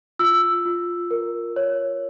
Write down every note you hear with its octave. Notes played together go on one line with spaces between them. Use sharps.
F4 E6
F4
A#4
C#5